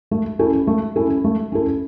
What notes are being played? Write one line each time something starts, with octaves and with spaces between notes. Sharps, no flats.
A3
C#4 E4 A4
A3
C#4 E4 A4
A3
C#4 E4 A4